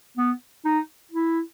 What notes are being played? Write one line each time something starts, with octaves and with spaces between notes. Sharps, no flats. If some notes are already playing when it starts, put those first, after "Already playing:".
B3
D#4
E4